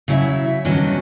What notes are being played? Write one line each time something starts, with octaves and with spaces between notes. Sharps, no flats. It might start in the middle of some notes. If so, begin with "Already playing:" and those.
C#3 F#3 E4 D#5 E5
G2 D#3 F#3 B3 C#4 D4